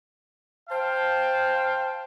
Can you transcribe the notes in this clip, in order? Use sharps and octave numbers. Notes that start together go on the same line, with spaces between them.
C5 F5 G5 A5